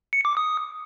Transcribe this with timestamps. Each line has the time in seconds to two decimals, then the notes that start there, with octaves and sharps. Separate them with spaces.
0.13 C#7
0.25 D6
0.37 D#6